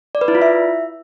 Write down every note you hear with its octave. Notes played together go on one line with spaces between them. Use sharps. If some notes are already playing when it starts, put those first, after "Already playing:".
D5
B4
E4
F4
E5